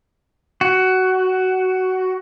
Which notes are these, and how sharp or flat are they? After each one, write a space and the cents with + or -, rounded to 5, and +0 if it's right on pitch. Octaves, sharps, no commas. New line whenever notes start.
F#4 +15